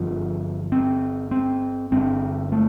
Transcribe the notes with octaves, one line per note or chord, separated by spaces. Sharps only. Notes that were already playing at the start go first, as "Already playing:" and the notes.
Already playing: G1 G2 D3 F3
C4
C4
G1 G2 D3 C4
A3